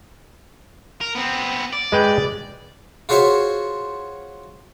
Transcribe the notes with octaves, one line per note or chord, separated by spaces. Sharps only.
A#4
B3 C4
D5
G#3 B4 G5
F4 F#4 G#4 C5 C#5 E5